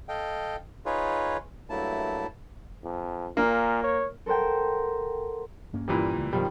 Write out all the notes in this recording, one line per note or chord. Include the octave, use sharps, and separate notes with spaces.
A4 D#5 F5 G5
D#4 F4 G#4 B4 C#5
G2 F#3 A3 A#3 E4 A5
F2
A#2 A#3
C#5
A4 A#4 C5 F#5 G5
G2 A#3 C#4
A#2 E3 G3
C#2
F#2 B2 D#3 F3 G3